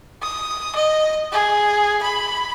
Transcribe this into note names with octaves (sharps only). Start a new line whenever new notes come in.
D#6
D#5
G#4
B5